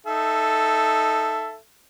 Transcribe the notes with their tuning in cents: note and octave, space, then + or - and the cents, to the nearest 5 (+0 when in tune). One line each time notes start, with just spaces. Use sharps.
D#4 +0 A4 +0 E5 +15